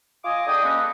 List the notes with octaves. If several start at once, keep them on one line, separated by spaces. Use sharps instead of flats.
F4 D#5 G#5 D6 D#6
D3 G#4 G5 D#6
G#3 A#3 C#4 F#4 A4 B4